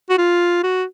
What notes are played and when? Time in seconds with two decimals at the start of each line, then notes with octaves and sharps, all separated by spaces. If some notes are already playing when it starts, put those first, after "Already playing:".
0.10 F#4
0.18 F4
0.63 F#4